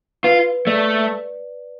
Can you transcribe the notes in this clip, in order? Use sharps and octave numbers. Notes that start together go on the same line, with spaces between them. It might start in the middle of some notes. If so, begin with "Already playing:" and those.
F4 B4
A3 D5